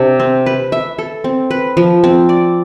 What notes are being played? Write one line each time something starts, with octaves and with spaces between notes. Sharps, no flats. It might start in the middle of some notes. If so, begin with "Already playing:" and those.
Already playing: C3 D4
C4
B4
E5
A4
C4
B4
F3
C4
D5